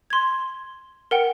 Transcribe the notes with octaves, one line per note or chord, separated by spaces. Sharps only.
C6 G#6
A#4 F#5 G5